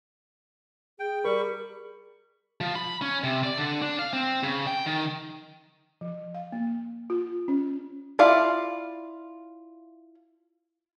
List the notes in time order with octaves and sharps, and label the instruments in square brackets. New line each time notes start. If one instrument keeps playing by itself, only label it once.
[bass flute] G#4 [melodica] G5
[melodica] G3 B5 C#6 [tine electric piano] A#4
[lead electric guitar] F3
B5
C#4
C3
D5
D3
D4
F5
C4
C#3
G5
D#3
[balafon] F3
F5
A#3
F4
C#4
[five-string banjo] E4 F4 D5 F5